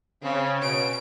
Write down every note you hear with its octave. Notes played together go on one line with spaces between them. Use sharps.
C#3 C4
B2 C#4 D7